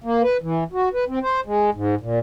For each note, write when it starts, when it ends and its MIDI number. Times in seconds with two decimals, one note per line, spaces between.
0.04 0.22 58
0.23 0.37 71
0.41 0.64 52
0.73 0.89 66
0.93 1.04 71
1.08 1.19 60
1.23 1.41 72
1.46 1.70 56
1.74 1.95 44
2.01 2.19 46